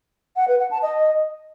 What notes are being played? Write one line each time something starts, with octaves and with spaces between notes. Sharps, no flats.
F#5
B4
F#5
A5
D#5